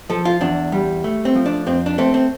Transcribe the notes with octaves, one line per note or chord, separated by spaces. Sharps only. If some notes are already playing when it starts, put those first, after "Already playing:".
F3 A4
F4
E2 D4
G3
A3
C4
F3
D4
F2 C4
D4
A3 C4
C4